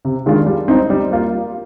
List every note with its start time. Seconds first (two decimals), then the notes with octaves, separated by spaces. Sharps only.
0.05 C3
0.26 D#3 G#3 D4 F4
0.46 G3
0.68 C4 D#4
0.90 G3
1.11 A#3 F4